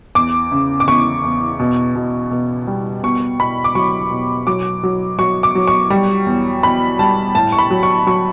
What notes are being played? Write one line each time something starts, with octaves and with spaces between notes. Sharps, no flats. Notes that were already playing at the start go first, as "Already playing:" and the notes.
E2 D6
C#3
D6
E2 C#6
E2
B2
B2
B2
G3
B2 C#6
B2 B5
D6
F#3 C#6
B2
F#3 D6
F#3
F#3 C#6
D6
F#3
C#6
G3
E2
E2 B5
G3 A5
A2 A5
C#6
B5
F#3
C#6
F#3 C#6